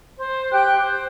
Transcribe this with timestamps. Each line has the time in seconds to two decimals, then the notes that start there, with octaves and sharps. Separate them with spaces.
0.17 C5
0.52 G4 G5 F#6
0.80 C5